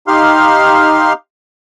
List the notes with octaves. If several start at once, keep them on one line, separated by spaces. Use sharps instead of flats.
D#4 G4 F5 C6 F6